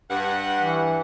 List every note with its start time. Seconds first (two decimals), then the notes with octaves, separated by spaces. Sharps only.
0.11 G2 F#5
0.60 E3